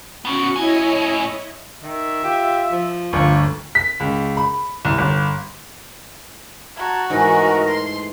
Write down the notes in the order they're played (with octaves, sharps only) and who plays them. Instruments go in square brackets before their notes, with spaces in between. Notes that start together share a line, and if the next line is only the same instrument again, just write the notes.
[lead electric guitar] B3 C#4 [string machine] F#4 C#7
[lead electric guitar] A2 G#5 [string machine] E4 C#5 D#5
[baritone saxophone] D#3 [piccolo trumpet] E5
[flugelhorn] F4 [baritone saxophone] G4
[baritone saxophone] F3
[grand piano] G1 D2 [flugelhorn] F4 [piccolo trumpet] C#6
[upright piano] B6
C#2
B5
C2
G1
[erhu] F#4 [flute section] A5 A#5 G#6
[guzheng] G#2 E3 A3 [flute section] A#4 D#5
[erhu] C6